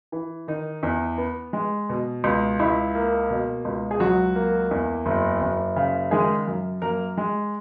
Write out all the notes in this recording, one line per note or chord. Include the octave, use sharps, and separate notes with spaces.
E3
D#3 D#4
E2
B3
G#3
B2
C#2
C#2 E4
A#3
B2
C#2
G#4
C#2 F#3 F#4
A#3
E2
F#1
F#1
C#3
D#3 G#3 G#4
F#2
F#2 A#3 A#4
G#3